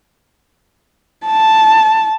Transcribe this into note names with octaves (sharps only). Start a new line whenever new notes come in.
A5